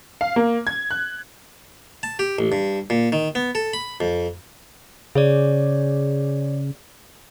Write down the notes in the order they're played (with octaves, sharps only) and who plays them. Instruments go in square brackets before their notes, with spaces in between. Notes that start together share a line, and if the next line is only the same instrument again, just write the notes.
[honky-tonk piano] F5
A#3
G#6
F#6
[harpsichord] A5
G4
A1
G2
A#2
D#3
B3
A4
B5
F2
[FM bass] C#3 [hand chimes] G#4 C#5 D5